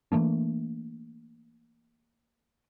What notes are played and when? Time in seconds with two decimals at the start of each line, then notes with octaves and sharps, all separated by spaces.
0.12 E3 A3 A#3 D4